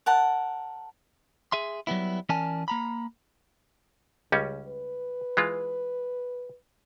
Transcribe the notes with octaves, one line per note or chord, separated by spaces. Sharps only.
A#4 F#5 A5
G#4 E5 C6
F#3 G3 B3 E4
E3 C#4 A#4 D5 G#5 A5
A#3 A#5 B5
C#2 C#3 G3 C#4
B4
E3 G#3 F4